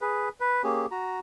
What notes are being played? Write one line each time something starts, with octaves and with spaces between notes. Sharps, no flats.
G#4 B4
B4
A#3 C#4 G4 G#4
F#4 A#5